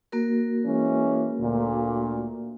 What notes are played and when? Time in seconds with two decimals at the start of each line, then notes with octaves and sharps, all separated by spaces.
0.12 A#3 F#4 A#4
0.65 E3 G#3 C#4
1.40 D2 A#2